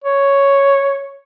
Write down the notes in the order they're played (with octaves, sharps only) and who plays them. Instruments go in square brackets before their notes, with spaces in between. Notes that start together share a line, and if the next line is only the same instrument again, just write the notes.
[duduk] C#5